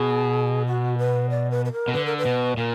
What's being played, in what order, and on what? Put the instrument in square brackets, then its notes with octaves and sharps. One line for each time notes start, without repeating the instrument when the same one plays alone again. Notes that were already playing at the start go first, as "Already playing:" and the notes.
Already playing: [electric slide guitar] B2 [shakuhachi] G#4
[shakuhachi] F#4
B4
D5
B4
B4
A#4
[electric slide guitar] B2
[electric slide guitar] D3 [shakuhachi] B4
[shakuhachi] A#4
B4
[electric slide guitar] B2
[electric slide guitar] A#2 [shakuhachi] A#4